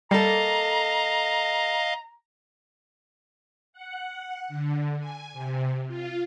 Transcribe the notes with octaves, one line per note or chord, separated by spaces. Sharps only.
G3 A#3 A4 D#5 F5 A#5
F#5
D3
G#5
C3
F4